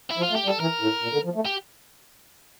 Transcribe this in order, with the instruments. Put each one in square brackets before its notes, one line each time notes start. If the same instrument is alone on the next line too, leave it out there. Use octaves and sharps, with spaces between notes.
[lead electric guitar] E4
[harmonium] F3
[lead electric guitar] F4
[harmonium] A3
[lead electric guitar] G4
[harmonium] G3 [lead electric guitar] A4
[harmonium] E3 [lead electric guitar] A#4
[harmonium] A2
A#2
D3
F3
A3
[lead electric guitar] G4